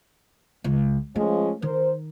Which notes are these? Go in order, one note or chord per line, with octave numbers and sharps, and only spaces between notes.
C#2
F3 G#3 A3 C#4
D#3 A#4 C5